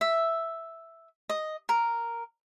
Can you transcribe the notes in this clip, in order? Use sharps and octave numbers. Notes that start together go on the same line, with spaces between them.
E5
D#5
A#4